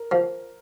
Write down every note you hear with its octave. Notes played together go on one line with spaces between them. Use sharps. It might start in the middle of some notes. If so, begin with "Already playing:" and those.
Already playing: A#4
F3